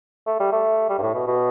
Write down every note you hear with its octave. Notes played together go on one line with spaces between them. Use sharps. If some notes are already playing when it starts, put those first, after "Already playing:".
A3
G3
A3
G3
G2
A2
B2
B2